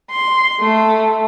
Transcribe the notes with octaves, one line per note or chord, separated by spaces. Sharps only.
C6
A3